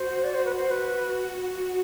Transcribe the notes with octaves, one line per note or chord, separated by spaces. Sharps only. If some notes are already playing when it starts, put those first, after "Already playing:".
Already playing: F#4 C5
D5
C5
B4
C5
B4